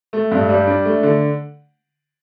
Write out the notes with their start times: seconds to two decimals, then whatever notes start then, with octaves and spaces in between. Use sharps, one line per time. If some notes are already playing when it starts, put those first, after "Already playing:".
0.13 A3
0.31 G2
0.49 G3
0.67 D4
0.85 A3
1.03 D3